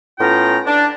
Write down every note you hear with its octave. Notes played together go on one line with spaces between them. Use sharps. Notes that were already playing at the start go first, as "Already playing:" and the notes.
A2 B3 C#4 F4 G5 A#5
D4